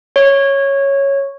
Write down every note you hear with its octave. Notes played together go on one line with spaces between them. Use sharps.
C#5